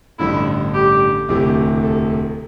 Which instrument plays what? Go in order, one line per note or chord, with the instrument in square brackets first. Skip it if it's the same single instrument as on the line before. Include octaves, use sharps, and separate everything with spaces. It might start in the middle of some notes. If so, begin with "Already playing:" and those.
[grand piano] A1 G2 D3 [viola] E4
[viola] G4
[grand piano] E1 D2 C3 E3 [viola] G4
[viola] A4